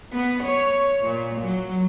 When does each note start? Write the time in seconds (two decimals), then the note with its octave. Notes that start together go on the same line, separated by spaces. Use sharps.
0.14 B3
0.46 C#5
1.05 A#2
1.42 F#3